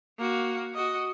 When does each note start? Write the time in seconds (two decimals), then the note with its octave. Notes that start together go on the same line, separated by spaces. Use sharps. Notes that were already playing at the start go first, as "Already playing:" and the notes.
0.18 A#3 F#4
0.75 F#4 D#5